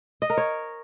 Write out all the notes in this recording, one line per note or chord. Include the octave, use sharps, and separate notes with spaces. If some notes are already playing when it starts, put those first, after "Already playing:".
D#5
A#4
C#5